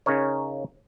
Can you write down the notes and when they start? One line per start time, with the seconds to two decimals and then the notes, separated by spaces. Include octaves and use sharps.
0.06 C#3 C#4 D#4 A#4 C#5